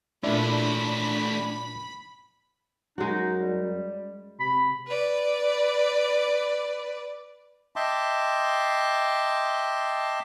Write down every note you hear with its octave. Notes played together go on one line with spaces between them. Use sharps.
A#2 A3 C#4 D4 E4 B5
F#2 G#3 D#4 F#4
G3
C3 B5
B4 D5
D#5 E5 G5 A5 C6 D6